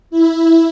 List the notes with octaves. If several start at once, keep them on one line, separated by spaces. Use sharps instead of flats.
E4